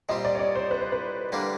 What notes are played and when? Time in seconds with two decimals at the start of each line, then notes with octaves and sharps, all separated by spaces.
0.09 A#2 G3 C4 D#5
0.25 D5
0.35 C#5
0.39 D5
0.56 C5
0.71 B4
0.81 C5
0.92 B4
1.32 D3 G3 A#3 D4